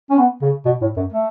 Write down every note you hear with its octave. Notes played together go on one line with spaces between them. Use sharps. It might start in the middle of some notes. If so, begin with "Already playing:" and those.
C#4
B3
C#3
B2
A2
F#2
A3